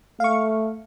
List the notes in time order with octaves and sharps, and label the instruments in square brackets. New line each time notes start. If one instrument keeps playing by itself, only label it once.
[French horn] A3 [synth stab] F5 C#6